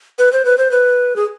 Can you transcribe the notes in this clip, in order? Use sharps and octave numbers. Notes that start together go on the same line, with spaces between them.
B4
C5
B4
C5
B4
G#4